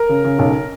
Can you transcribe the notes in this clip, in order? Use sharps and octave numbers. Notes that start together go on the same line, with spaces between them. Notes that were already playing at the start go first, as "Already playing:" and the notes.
Already playing: A#4
C#3
C#3
B1